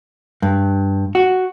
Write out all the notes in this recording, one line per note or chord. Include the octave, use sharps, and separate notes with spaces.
G2
F#4